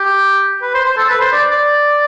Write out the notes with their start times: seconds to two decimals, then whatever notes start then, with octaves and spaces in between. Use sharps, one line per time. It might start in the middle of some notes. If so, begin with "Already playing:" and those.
Already playing: G4
0.62 B4
0.75 C5
0.86 C5
0.97 A4
1.10 B4
1.21 C5
1.32 D5
1.51 D5